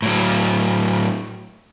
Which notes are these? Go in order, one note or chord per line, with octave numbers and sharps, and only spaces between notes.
A2 F#3